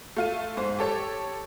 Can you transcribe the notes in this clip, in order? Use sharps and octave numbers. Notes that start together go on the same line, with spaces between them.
A3 F4 D#7
G#2 C5
G4 A4 C#5